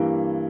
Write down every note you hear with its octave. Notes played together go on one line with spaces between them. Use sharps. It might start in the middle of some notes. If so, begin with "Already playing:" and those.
Already playing: G2 E3 G3 A#3